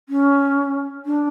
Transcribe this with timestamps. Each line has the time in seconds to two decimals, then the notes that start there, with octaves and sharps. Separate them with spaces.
0.09 C#4
1.05 D4